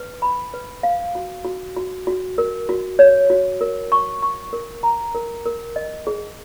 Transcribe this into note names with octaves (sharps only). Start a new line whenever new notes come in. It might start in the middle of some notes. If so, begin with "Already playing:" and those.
Already playing: B4
B5
B4
F5
F#4
F#4
F#4
F#4
A#4
F#4
C#5
F#4
A#4
C#6
C#6
A#4
A#5
A#4
A#4
D#5
G#4